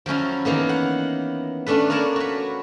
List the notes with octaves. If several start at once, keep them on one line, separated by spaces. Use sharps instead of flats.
F3 F#3 C#4 E4
D#3 E3 A#3 B3
F#5
A3 C#4 D4 A4 B4
A#3 A#4 C#5 D5 A5
F#4 B4